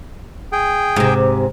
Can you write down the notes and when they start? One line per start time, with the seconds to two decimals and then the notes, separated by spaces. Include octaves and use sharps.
0.52 G#4 G5
0.96 G#2 C3